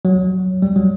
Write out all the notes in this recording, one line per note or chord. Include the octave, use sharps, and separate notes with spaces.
F#3
G3
F#3